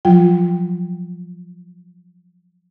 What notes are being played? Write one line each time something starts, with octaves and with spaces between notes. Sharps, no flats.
F3 F#3 F4 G5